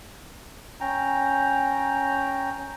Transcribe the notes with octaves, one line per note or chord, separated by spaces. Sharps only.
C#4 G5 A#5